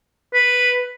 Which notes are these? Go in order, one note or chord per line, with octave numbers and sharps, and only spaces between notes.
B4